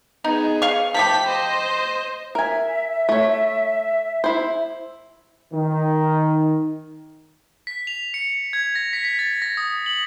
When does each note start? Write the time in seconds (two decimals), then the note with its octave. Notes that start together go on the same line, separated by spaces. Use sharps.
0.24 B3 D#4 G#4
0.62 F5 C#6
0.94 F3 A3 G4 B5 B6
1.26 C5 D#5
2.35 A#4 E5 G#5
3.09 A3 C#5
4.24 E4 C5
5.53 D#3
7.67 B6
7.87 F7
8.14 C#7
8.53 G#6
8.75 A#6
8.93 B6
9.05 B6
9.19 A6
9.42 A#6
9.57 D#6
9.86 F#7